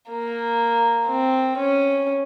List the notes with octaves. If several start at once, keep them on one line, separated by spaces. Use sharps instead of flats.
A#3
C4
C#4